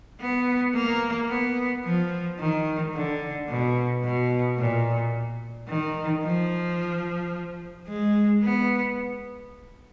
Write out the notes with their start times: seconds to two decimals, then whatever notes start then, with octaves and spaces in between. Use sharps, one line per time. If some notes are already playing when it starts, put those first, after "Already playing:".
0.20 B3
0.75 A#3
1.29 B3
1.85 F3
2.40 D#3
2.94 D3
3.49 B2
4.04 B2
4.58 A#2
5.69 D#3
6.24 F3
7.88 G#3
8.43 B3